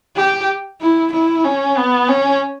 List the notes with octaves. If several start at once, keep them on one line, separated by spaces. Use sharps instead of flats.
G4
E4
E4
C#4
B3
C#4